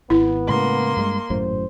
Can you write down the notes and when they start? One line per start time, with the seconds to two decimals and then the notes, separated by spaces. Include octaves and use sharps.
0.10 G#1 B3 E4
0.49 A2 C#3 G#3 A#3 C6
0.97 G2 F#3 G#3
1.30 G#1 F#2 A2 C5